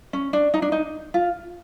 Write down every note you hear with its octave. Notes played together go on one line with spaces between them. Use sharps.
C#4
D4
D#4
D4
D#4
F4